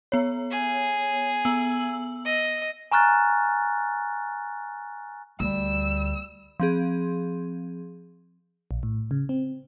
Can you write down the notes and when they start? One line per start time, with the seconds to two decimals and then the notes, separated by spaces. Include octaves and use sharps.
0.12 B3 C#5
0.51 G#4
1.45 B3 E6 F#7
2.25 D#5
2.92 G#5 A#5 C#6 F6 F#6 A6
5.40 D2 G3 E6
6.60 F3 C4 G#4
8.71 A#1
8.83 A2
9.11 C#3
9.29 C4